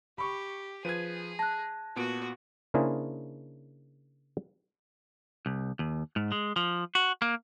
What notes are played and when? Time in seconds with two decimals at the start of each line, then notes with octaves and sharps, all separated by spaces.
0.18 G4 B5 C#6
0.85 F3 G#4 B4 G#6 D#7
1.39 A5 F#6 A#6
1.96 A#2 B3 F#4 D7
2.74 C#3 A#3 D4 E4 G#4 C5
5.46 C2
5.79 D#2
6.16 G#2
6.32 G#3
6.56 F3
6.95 F#4
7.22 A#3